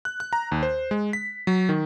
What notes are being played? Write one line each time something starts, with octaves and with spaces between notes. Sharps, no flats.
F#6
F#6
A#5
D#2
C5
G#3
B6
F#3
D#3